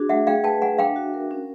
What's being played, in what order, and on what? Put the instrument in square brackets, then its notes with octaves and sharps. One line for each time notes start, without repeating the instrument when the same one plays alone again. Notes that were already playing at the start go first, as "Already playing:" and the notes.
Already playing: [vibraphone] D4 F#4 G#4
[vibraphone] A3 [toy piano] E5 F#5
[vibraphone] G#4 [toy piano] F5 G5
[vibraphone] B4 [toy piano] G5 A5
[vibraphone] E5 [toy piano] F#5 G#5
[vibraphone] D4 [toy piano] F5 G5
[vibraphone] F#4
A#4
C#4